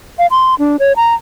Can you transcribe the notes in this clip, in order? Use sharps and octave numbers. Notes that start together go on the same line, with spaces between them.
F5
C6
D4
C#5
A#5